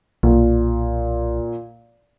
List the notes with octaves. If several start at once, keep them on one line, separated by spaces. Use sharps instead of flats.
B1 A#2